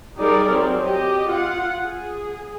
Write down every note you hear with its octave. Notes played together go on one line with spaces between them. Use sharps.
G3 D#4 G4 G#4 A#4 D5
F#3 C4
G4 D#5
F4 F#5
G#4